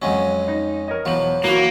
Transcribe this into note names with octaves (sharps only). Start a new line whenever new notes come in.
F2 F#3 G#3 C#4
D#4
A#4 C#5 D#5
E1 E2 F3 F#3 F#7
E3 A#3 F#4